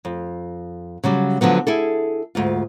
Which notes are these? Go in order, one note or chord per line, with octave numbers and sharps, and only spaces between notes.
F2
C#3 F#3 G3
D3 F3 F#3 B3
E4 G#4 A4
D2 G#2 F4